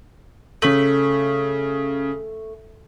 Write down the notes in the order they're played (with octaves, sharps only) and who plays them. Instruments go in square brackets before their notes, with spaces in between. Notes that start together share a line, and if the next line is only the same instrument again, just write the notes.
[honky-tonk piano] C#3 B6 F#7 [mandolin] A3